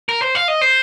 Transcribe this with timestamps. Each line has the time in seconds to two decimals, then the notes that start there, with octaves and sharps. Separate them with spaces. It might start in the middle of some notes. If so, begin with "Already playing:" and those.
0.09 A#4
0.22 C5
0.35 F5
0.48 D#5
0.61 C5